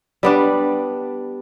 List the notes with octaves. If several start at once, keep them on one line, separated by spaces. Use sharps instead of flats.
G3 B3 D4